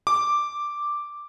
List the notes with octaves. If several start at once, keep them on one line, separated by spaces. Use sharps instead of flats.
D6